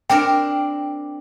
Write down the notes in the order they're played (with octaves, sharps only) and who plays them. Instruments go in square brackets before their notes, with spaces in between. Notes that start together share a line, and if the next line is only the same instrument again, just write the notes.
[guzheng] C4 D4 A#4 [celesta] G5